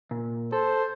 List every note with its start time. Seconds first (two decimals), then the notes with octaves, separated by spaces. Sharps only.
0.11 A#2
0.52 A4 C5